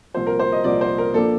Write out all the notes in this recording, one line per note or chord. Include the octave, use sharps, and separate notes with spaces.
C2 A#2 F3 C5
A#4
C5
D#5
C2 A#2 F3 D5
C5
A#4
A#2 F3 A#3 D4 A4